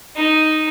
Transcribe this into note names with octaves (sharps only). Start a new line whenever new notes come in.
D#4